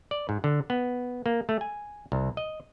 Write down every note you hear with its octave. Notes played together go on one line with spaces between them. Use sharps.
D5
G#2
D3
B3
A#3
A3
G#5
C2
D#5